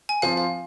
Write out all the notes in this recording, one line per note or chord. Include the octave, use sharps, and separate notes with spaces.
G#5
F3 C4 F4 F5
F5